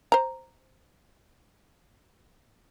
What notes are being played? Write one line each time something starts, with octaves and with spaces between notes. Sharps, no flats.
C5 A#5